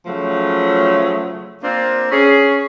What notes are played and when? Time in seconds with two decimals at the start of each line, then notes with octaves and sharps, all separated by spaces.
0.06 C#3 F3 F#3 A3
1.63 A#3 C4 D4 F4
2.11 C#4 G#4